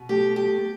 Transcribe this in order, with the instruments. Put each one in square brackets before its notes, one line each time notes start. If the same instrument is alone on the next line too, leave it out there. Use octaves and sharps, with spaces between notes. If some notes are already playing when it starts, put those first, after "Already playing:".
Already playing: [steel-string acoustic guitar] B2
[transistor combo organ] A3 [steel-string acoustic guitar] G4
[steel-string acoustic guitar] G4